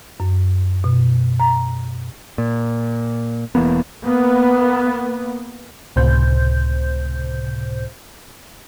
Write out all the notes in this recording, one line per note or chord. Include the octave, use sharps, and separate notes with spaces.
F#2
B2
A#5
A#2
E1 E3 A#3 B3
A#3 B3
C#2 A2 C3 C5 G6